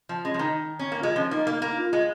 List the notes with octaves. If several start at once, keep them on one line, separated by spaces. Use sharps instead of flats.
F3
G#3 C#4
F3
D#3 D#4
C#4
A#3
F4
G#3
F3 C#4
A#3 D#4
A#3
A#3
D#4
F4
G#3